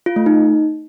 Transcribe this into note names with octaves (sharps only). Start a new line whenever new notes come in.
F4
A3
D#4